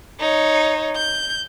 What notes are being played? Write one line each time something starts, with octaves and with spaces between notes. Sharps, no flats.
D#4 C#5
G6